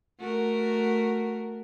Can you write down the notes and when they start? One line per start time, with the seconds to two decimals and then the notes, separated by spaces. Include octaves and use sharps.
0.19 A3 F#4 A#4